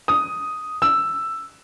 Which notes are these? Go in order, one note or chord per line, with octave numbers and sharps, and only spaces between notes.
D#6
E6